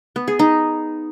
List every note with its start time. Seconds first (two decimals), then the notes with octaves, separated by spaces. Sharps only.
0.16 B3
0.28 G#4
0.39 D#4